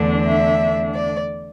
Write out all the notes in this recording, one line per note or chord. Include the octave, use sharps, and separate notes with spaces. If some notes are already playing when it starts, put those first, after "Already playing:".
Already playing: E2 D3 A3 D4
E5
D5